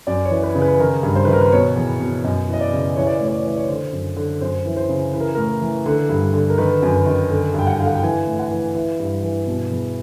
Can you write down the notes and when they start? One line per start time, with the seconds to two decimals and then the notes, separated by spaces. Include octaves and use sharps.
0.07 F#2 D5
0.25 C#5
0.31 E3
0.43 B4
0.55 C#3
0.62 B4
0.79 D#3 A#4
1.03 G2
1.15 C5
1.25 D#3 B4
1.33 A#4
1.41 B4
1.52 B2 C#5
1.76 E2
2.00 B2
2.24 F#2 D#5
2.48 E3
2.53 D#5
2.61 D5
2.73 C#3
2.96 E3 C#5
3.07 D5
3.17 A2 C#5
3.28 D5
3.38 C#5
3.45 E3 D5
3.58 C#5
3.69 D3 C5
3.93 F#2
4.16 D3
4.41 F#2 C5
4.66 E3
4.77 C5
4.89 C#3
5.14 E3 B4
5.20 A#4
5.35 A2 A#4
5.62 E3
5.86 D3
6.09 G2
6.33 D3
6.50 A#4
6.58 D#3 B4
6.82 F#2
6.94 B4
7.06 D#3
7.30 D3
7.54 G2 G5
7.67 F#5
7.79 D3 F5
7.87 F#5
7.95 G5
8.03 E3 G#5
8.27 A2
8.40 F#5
8.51 E3
8.75 E3
9.00 G2
9.23 E3
9.47 B2
9.71 E2